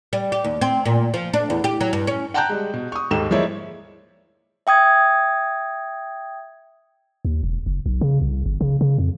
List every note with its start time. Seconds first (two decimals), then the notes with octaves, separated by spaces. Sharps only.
0.13 G3
0.32 G4
0.44 D#2
0.61 C4
0.86 A#2
1.14 F3
1.34 D4
1.50 E2
1.64 G4
1.81 F#3
1.93 G2
2.07 C#4
2.34 F#5 G5 A5 A#5 F#6 G6
2.49 G3 G#3
2.74 B2
2.92 C#6 D#6
3.11 D#2 G#2 A4 G5 E7
3.31 F3 G#3 A#3 E4 C#5 D5
4.67 E5 G5 D#6 G#6
7.25 D#2
7.43 E1
7.66 F#1
7.86 B1
8.01 C#3
8.21 C2
8.46 G1
8.61 C#3
8.81 C#3
8.98 F2